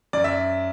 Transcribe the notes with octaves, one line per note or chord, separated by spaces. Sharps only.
F#2 D5
E5